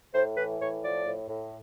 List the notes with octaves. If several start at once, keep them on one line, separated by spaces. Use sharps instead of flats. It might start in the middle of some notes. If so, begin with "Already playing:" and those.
A2 C5
E3 B4
A2 C#5
F3 D5
A2
A2